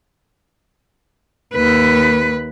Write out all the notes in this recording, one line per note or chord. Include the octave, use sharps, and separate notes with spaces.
D#2 B4